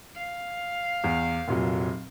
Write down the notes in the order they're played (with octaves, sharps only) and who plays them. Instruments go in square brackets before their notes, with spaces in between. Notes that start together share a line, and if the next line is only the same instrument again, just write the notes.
[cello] F5
[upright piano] E2
F1 A#2 F#3